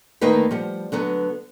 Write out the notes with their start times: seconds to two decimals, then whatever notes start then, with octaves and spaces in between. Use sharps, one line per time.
0.21 D2 D#3 A#3 D#4 B4 F5
0.51 F3 G3 F#5
0.92 D3 F#3 B3 B4